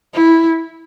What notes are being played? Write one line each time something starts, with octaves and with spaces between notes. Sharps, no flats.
E4